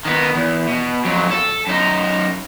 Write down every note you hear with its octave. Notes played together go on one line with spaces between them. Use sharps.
D#3 B3
E2
B2
F2 F#3
A4
F#2 D#4